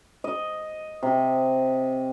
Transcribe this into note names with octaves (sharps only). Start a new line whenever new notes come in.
D#5
C3